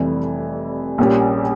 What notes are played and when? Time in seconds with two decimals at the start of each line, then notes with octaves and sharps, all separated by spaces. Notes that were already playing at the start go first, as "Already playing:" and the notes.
Already playing: F1 F2 E3 G3
0.98 A#1 A#2 G3 C#4 G4